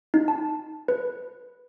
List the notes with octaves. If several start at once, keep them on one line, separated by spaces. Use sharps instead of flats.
D#4
A5
B4